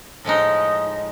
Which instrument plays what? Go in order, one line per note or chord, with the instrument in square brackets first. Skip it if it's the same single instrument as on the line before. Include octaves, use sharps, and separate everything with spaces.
[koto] A2 F3 G#3 D#4